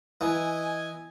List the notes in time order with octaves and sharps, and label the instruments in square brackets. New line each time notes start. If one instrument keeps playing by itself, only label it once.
[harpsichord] E3 [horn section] D#5 G#5